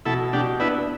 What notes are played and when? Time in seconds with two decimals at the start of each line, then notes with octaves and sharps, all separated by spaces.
0.05 B2 E4 A4
0.33 B2 D4 G4
0.60 B3 D4 E4